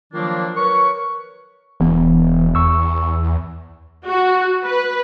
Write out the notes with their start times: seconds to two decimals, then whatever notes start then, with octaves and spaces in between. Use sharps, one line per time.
0.12 D#3 F3 F#3 A#3 D4 F4
0.56 A#4 B4 C#5 C#6
1.80 E1 E3 B3
2.55 E2 C#6 E6
4.07 F#4
4.65 B4